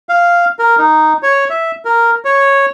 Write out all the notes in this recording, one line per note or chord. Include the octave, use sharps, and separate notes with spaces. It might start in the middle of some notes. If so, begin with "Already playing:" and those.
F5
A#4
D#4
C#5
E5
A#4
C#5